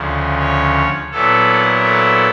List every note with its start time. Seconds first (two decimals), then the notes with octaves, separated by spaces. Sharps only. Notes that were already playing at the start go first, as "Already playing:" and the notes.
Already playing: D2 C#3 F3
0.39 C#5
1.11 A#2 F#3 B3 E4 A4
1.83 A4